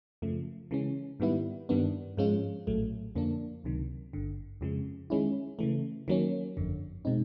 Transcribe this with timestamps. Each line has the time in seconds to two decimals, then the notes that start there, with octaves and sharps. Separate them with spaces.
0.22 F#2 C#3 F3 A3
0.71 C#3 E3 G#3 C#4
1.20 G#2 D#3 G3 B3 E4
1.69 G2 D#3 G3 B3 D4
2.17 G#2 F3 G#3 C#4 F4
2.67 A#1 A2 F#3 A3
3.15 F2 D3 F3 A#3 D4
3.64 C#2 C3 D#3 F#3
4.13 G#1 G2 D3
4.61 F2 C#3 F3 G#3
5.10 D#3 G#3 C#4 E4
5.59 C#3 E3 A3
6.08 D#3 F#3 A#3 C#4
6.57 G1 F2 D3
7.05 B2 G#3 C4 D#4